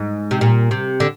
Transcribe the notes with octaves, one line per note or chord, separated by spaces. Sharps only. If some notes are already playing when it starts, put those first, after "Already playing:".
Already playing: G#2
C3
A#2
C3
D3